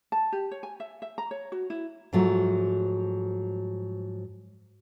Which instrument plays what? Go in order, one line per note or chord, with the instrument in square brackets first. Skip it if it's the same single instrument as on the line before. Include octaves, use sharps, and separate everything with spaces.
[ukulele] A5
G4
C#5
G#5
E5
E5
A#5
C#5
F#4
E4
[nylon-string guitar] G#2 F3 F#3 A3